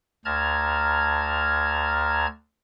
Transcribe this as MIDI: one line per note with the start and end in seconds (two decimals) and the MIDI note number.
0.25 2.26 38
0.25 2.26 81
0.25 2.26 82
0.25 2.26 89
0.25 2.26 92